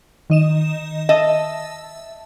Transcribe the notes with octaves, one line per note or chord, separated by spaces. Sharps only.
D#3 D#5 E7
D#5 E5 A5